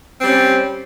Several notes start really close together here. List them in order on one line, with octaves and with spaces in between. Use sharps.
C4 G3 C#4